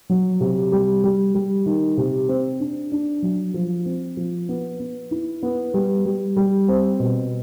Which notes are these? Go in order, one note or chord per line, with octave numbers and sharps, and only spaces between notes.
F#3
C3
G3
G3
G3
D#3
C3
C4
D4
D4
F#3
F3
C4
F3
B3
B3
E4
B3
G3
G3
G3
C4
B2